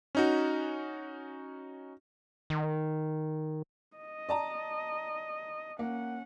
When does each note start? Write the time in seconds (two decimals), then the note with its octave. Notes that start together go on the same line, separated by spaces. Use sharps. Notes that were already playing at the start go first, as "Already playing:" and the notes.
0.15 C#4 D#4 F#4
2.50 D#3
3.97 D#5
4.29 D5 A5 A#5
5.79 A#3 C#4 F#5